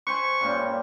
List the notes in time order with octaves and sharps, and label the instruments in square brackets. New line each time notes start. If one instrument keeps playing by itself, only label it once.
[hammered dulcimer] B4 C5 G#5 [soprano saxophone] C#6
[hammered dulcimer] G2 A#2 C#3
G2